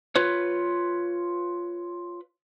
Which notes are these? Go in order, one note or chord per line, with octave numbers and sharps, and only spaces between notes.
F4 B4 C#5